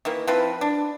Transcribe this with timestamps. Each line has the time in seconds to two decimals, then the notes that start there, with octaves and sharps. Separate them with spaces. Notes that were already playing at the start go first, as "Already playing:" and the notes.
0.05 D#3 E3 A#3
0.28 F3 C4 E4 B4
0.61 D4